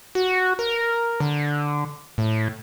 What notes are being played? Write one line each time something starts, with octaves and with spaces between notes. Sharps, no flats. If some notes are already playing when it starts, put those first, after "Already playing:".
F#4
A#4
D3
A2